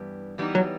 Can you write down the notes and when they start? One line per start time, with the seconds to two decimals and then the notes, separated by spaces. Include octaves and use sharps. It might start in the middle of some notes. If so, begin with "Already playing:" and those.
Already playing: G2 E3 G3 B3
0.38 E3 G3 B3 D#4
0.55 F#3